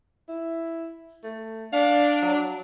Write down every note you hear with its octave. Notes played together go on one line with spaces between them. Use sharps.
E4
A3
D4 F5
F#3